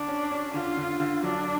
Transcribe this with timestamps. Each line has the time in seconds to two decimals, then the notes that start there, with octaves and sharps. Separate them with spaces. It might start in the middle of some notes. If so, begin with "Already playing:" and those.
Already playing: D3 D4
0.08 C#4
0.31 C#4
0.54 D3 F4
0.77 D3
1.00 D3
1.23 F#3 D4